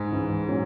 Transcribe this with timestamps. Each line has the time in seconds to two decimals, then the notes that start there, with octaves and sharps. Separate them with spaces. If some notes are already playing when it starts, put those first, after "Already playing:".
Already playing: G#2
0.11 C#2 C#3 E3
0.48 A#2 F#3 C#4